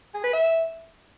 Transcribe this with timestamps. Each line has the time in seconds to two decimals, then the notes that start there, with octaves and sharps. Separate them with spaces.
0.14 G#4
0.24 B4
0.33 E5